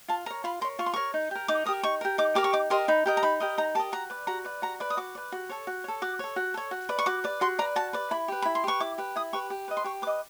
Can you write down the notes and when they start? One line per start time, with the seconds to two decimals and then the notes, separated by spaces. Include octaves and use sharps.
0.08 F4 A5
0.26 A#4 C#5 A#5
0.44 F4 B5
0.61 A#4 C6
0.64 C#5
0.79 F4 C#6
0.86 C6
0.94 A#4 C#5 C#6
1.14 D#4
1.31 G4 A#4
1.48 D#4 D6
1.66 G4 A#4 D#6
1.83 D#4 C#6
2.01 G4 A#4
2.18 D#4 D6
2.35 G4 A#4 D6
2.44 C#6
2.53 D#4 D6
2.70 G4 A#4 D#5 C6
2.88 D#4 B5
3.06 G4 A#4 D#5
3.17 A#5
3.23 D#4 B5
3.40 G4 A#4 D#5
3.58 D#4 A#5
3.75 G4 A#4 D#5 A5
3.92 F#4 A#5
4.10 B4 D5
4.27 F#4 A#5
4.45 B4 D5
4.62 F#4 A#5
4.80 B4 D5
4.90 D#6
4.97 F#4 D6
5.15 B4 D5
5.32 F#4
5.49 A4 C#5
5.67 F#4
5.84 A4 C#5
6.02 F#4 D6
6.19 A4 C#5
6.36 F#4
6.54 A4 C#5
6.71 F#4
6.89 B4 D5
6.99 C#6
7.06 F#4 D6
7.24 B4 D5
7.41 F#4 C6
7.59 B4 D5 A#5
7.76 F#4 A5
7.93 B4 D5
8.11 E4 B5
8.28 G4 B4
8.42 E4 B5
8.55 C6
8.64 G4 B4 C#6
8.80 E4 D6
8.98 G4 B4
9.16 E4 D#6
9.33 G4 B4 C#6
9.50 G4
9.68 B4 D#5
9.77 C6
9.84 G4 C#6
10.02 B4 D6
10.07 D#5